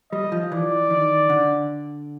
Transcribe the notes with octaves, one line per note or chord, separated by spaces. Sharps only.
G3 D#5
F3
E3 D5
D#3
D3